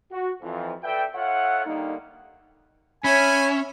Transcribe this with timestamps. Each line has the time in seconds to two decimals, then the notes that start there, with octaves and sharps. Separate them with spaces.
0.12 F#4
0.42 F2 E3 F3
0.83 A4 B4 D5 E5 G5
1.15 F4 A4 C#5 E5 F#5
1.66 D3 D#3 G3 A#3 D#4
3.04 C#4 C#5 E5 G#5 B5